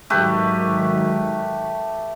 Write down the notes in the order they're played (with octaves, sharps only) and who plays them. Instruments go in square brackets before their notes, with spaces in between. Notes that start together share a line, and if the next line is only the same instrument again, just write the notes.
[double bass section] G#2 D#3 F#3 [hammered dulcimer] A3 G4 B4